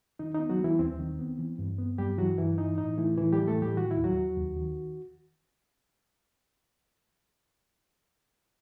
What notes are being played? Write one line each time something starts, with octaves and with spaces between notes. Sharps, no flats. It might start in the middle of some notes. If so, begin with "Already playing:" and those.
D#3 D#4
B3 D#4
F#3 F#4
E3 G3 E4
D#2 C4
D#3
B3
E3
G2
B3
G2 G3 G4
E3 F#3 F#4
G2 E3 E4
E3 D#4
A2 D#4
E3 A3 E4
A2 E3 E4
E3 G3 G4
A3 A4
A2 G3 G4
D#3 F#4
E4
D#2
F#3 F#4
F#3
D#2
D#3